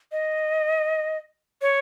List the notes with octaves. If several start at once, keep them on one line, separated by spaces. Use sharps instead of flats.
D#5
C#5